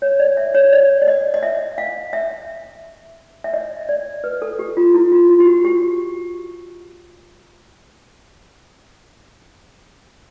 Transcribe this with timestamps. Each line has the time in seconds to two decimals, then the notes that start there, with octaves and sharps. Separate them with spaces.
0.02 C#5
0.20 D5
0.37 E5
0.55 C#5
0.73 D5
1.02 D5
1.08 D#5
1.34 D#5
1.43 E5
1.78 F5
2.13 E5
3.44 E5
3.54 D#5
3.89 D5
4.24 B4
4.42 A4
4.59 G4
4.77 F4
4.94 E4
5.12 F4
5.29 F4
5.40 G4
5.47 F#4
5.65 G4